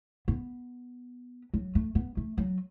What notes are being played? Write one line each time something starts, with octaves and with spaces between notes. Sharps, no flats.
B3
F#3
A3
B3
A3
F#3